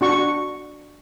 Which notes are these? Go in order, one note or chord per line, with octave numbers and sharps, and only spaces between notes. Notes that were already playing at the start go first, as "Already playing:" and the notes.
D4 F#4 C#6